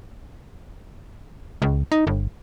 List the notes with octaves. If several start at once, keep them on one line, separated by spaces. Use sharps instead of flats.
C#2
D#4
G1